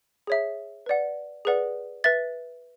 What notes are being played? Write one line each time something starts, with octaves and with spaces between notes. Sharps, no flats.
G#4 C#5 E5
B4 D5 F#5
G#4 B4 D5 F#5
B4 E5 A6